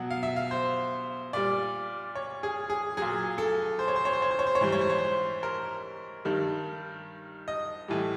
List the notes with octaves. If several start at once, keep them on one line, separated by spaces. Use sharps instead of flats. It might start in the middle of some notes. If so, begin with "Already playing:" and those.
Already playing: B2 F#3 F#5
F5
E5
F5
C5
A#2 G3 D5
C#5
G#4
G#4
A#2 F#3 G#4
A4
C5
C#5
C5
C#5
C5
C#5
C5
C#5
C5
C#5
G#2 E3 G3 C5
C#5
C5
C#5
C5
A#4
G2 D#3 G3
D#5
A2 E3 G3